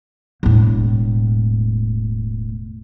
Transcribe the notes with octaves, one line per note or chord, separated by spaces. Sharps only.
E1 A2